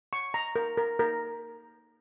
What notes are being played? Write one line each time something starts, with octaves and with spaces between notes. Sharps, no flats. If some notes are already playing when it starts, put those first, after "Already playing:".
C#6
A#5
A#4
A#4
A#4